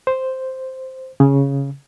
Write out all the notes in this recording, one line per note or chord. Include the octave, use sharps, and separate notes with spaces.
C5
C#3